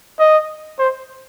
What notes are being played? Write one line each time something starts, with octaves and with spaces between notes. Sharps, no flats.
D#5
C5